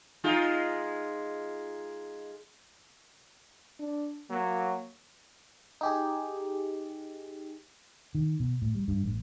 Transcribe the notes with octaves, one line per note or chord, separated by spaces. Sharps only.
G#3 D#4 F4
D4
F#3 A#3
D#4 G4 G#4
D#3
B2
A2
G3
G2
A1